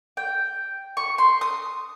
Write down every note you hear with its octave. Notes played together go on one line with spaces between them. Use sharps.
G5
C#6
C6
D#6